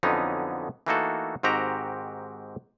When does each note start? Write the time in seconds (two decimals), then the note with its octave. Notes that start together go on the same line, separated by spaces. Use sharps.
0.03 F2 D3 F#3 B3 C#4 D#4
0.86 E3 A3 A#3 D#4 F#4 A4
1.43 G#2 D#3 C4 F#4 G4 A#5